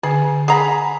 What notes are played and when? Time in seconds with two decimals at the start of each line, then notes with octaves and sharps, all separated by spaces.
0.03 D3 G#4
0.48 G#4 F#5 A#5 B5